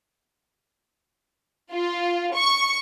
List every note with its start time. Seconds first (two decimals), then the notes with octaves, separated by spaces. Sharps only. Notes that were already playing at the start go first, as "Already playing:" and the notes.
1.73 F4
2.34 C#6